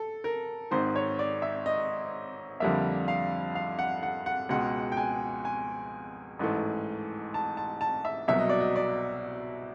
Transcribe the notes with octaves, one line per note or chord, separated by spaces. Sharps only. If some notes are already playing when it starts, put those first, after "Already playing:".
Already playing: A4
A#4
G#1 G#2 D#3 C5
C#5
D5
E5
D#5
F2 D3 G3 A#3 E5
F5
F5
F#5
F#5
F#5
C#2 B2 G#3 F#5
G5
G#5
G#5
A1 G#2 E3 A3
A5
A5
A5
E5
C2 B2 F#3 E5
D#5
D5
D#5
D5